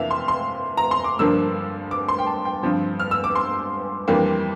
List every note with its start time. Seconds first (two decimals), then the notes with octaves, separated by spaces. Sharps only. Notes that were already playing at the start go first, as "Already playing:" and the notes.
Already playing: F2 C3 E3 A#3 D4 E5 F5
0.11 C6
0.28 C6
0.77 A#5
0.91 C6
1.04 D6
1.19 G2 D3 F3 A#3 D4 E6
1.91 D6
2.08 C6
2.19 G5
2.27 A5
2.45 G5
2.63 G2 D3 F3 C4
3.00 F6
3.11 E6
3.24 D6
3.35 C6
4.08 F2 E3 G3 A#3 D4